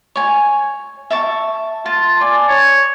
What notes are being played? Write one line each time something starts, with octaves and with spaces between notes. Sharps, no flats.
C#5 G#5
E5 A5 C#6
F4 A5
D5 G#5
C#5